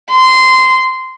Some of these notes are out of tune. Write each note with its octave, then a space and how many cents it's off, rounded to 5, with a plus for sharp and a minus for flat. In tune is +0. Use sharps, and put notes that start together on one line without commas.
C6 -15